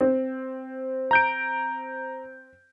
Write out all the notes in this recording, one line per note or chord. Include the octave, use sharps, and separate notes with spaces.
C4
A#5 G6 D7